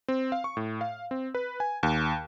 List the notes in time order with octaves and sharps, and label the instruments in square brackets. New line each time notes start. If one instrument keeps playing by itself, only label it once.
[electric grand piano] C4
F5
C#6
A2
F5
C4
B4
G#5
D#2